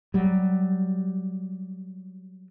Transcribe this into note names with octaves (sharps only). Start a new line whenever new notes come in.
F#3 G3